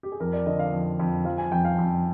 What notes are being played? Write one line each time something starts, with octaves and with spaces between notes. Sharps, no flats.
G4
G#4
F2 A#4
D5
D3 D#5
F5
F2
F2
F3 F5
G#5
F2 G5
F5
F2